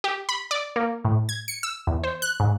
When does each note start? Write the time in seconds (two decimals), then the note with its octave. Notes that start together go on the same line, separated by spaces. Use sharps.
0.04 G4
0.29 B5
0.51 D5
0.76 A#3
1.05 A2
1.29 G#6
1.48 C#7
1.63 E6
1.87 E2
2.04 C5
2.22 F#6
2.40 G#2